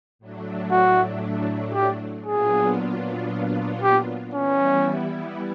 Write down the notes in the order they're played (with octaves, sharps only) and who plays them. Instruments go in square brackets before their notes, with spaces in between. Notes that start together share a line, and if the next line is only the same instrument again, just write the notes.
[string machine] A2 F#3 A3 D4
[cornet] F#4
G4
[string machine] A#2 F#3 B3 D4 F4 [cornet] G#4
[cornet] G4
[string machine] E3 G3 B3 E4 [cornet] C#4